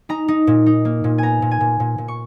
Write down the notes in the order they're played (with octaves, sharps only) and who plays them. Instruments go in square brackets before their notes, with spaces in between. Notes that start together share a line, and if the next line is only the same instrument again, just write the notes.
[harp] D#4 A#5
D#4
A#2
D#4
A#3
A#2
B3 G#5 A#5
A#2
G#5
A#2
A#2
A#2
C#6